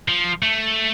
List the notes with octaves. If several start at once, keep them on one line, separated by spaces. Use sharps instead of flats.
F3
A3